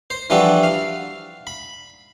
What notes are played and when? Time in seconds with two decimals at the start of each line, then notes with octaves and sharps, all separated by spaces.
0.10 C5
0.30 E3 F3 G3 D4 F#4 A4
0.63 F5
1.47 B5